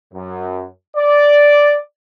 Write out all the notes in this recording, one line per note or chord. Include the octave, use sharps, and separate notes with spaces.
F#2
D5